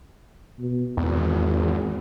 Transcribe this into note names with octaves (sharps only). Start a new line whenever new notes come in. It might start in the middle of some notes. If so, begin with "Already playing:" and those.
B2
G#1 E2